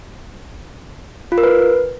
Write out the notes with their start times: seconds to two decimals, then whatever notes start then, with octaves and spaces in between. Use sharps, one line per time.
1.32 F4
1.38 A#4
1.43 B4